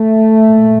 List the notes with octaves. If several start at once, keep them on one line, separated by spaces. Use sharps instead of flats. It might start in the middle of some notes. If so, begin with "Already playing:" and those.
Already playing: A3
A#2